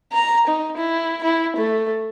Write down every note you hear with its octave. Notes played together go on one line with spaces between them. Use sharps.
A#5
D#4
E4
E4
A3